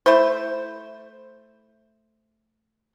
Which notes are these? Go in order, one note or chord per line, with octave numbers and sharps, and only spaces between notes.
A3 E4 C5